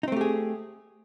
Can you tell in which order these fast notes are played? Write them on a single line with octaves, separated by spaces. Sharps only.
D#4 C4 A3 G4 G#4